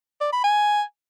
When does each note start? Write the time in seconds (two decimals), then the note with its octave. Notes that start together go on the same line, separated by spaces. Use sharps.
0.21 D5
0.32 B5
0.44 G#5